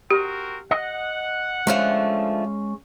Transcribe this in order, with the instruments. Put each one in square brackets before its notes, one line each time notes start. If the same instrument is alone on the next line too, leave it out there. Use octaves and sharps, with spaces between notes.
[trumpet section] C4 F#4 A#4 [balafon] G4
[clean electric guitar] D#5 [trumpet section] F#5
[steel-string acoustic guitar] D3 F3 A3 [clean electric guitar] G#3 C#4